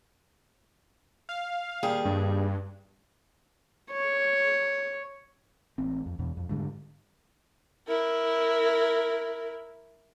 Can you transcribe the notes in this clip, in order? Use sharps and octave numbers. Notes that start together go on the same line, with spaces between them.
F5
D#2 G3 G#4
G2
C#5
A1 C4
F2
E2 B2
F2
G#2 D3 G3
E4 A#4